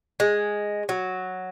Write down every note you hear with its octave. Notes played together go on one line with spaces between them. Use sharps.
G#3
F#3